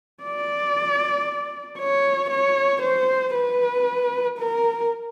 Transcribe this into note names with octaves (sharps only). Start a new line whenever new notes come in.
D5
C#5
C#5
C5
B4
A#4